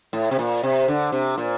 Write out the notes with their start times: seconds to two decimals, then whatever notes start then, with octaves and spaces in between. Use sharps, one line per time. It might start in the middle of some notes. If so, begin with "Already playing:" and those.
0.13 A2
0.31 C3
0.39 A#2
0.63 C3
0.88 D3
1.12 C3
1.38 A#2